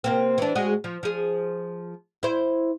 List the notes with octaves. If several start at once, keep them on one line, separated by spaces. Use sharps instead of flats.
C3 A#3 C4
E3 D4
G#3 F#4 G#4
F3
F3 G#4
E4 C5